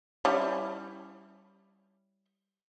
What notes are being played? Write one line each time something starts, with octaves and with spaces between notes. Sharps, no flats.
G3 C#4 E4